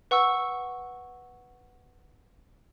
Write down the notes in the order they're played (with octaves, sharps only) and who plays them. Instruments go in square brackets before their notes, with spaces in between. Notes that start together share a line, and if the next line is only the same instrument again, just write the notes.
[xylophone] B4 F#5 C#6 E6